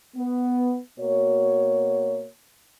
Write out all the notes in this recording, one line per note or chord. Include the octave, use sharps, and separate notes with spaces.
B3
B2 A#3 F#4 C#5